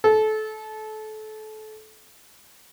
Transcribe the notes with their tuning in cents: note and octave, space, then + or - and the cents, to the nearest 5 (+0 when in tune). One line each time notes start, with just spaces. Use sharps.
A4 -25